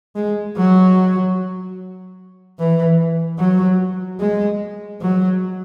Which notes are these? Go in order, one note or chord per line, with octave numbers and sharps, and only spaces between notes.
G#3
F#3
E3
F#3
G#3
F#3